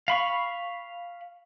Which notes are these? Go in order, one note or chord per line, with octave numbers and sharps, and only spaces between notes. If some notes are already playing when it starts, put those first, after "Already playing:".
F5 B5 C#6